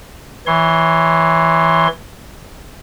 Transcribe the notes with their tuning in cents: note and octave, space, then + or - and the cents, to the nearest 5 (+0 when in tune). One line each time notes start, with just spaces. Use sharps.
E3 -5 C#5 +0 C6 +15